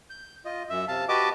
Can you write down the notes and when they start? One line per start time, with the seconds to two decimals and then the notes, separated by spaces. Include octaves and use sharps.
0.10 G6
0.45 F4 D#5
0.70 F#2 E5
0.88 C3 F5 A5
1.09 F#4 G4 B4 D#5 A5 D6